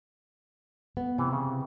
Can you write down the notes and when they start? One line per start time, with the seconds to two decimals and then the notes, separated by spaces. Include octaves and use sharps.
0.97 B3
1.18 C3 E3
1.33 C#3